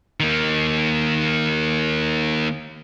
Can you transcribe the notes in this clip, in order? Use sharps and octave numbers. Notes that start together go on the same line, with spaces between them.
D#3 A#3